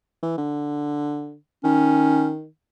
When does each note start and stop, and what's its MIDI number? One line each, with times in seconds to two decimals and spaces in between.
0.23 0.38 52
0.38 1.35 50
1.64 2.46 51
1.64 2.32 61